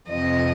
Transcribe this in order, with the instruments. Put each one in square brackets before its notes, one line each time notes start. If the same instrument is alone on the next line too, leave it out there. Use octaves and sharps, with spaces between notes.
[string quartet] F2 C3 F3 C4 D#5